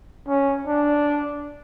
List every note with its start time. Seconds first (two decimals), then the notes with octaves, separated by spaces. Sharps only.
0.28 C#4
0.67 D4